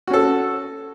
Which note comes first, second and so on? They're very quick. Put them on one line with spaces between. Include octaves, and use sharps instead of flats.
F#4 C#4 A4